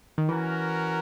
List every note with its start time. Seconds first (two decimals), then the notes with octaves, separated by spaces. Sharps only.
0.18 D#3
0.28 E3 C#4 F#4 A#4